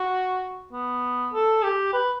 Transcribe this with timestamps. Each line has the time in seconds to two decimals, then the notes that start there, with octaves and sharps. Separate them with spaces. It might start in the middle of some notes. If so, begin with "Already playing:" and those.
Already playing: F#4
0.73 B3
1.33 A4
1.63 G4
1.93 B4